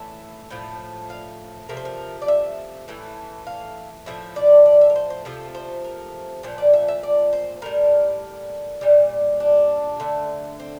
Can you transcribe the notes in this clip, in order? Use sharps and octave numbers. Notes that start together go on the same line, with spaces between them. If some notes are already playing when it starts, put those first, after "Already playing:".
Already playing: A2 E3 A3 E5
A2 F3 A3
F5
C3 F3 A3 A#4
C5
A#4
D5
E5
A2 E3 A3
F5
A2 F3 A3 E5
D5
D5
E5
A#4
C5
C5
C3 F3 A3 A4
C5
A#4
A#2 F3 A3 C5
D5
E5
E5
D5
C5
A2 G3 A#4
A#2 G3
D4
D3 A3
C4